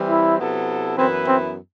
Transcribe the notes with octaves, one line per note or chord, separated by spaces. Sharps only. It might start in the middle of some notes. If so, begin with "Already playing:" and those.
Already playing: E3 G3 C4
E4
C3 F#3 B3 E4 A4
F#2 E3 B3 C4 E4 B4
C4